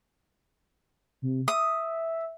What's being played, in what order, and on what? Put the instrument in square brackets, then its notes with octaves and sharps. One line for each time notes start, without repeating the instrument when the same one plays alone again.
[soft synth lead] C3
[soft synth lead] E5 [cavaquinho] D#6